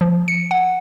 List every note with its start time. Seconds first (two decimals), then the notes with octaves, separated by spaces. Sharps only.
0.01 F3
0.28 C#7
0.51 F#5